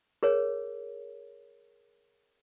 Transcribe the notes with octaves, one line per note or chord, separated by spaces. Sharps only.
G#4 A#4 C#5